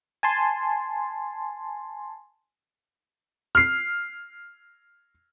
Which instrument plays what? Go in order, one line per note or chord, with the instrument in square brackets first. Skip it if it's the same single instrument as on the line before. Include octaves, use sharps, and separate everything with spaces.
[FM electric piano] G#5 A5 C6
[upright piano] F6 C7